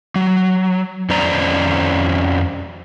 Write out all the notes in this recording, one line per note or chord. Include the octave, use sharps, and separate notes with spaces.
F#3
F2 C#4 C5 D5 A#5